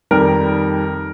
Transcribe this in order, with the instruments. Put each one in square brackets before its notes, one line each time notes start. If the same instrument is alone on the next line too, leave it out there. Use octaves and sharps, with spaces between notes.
[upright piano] F2 D#3 G3 A#4